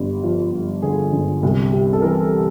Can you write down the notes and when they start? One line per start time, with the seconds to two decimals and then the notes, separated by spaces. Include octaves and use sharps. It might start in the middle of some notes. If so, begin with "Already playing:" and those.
Already playing: G1 G2 D3
0.23 F3 F4
0.53 G2
0.82 D3 G#4
1.13 G1
1.43 C2
1.73 C3
1.93 A4
2.02 E3 A#4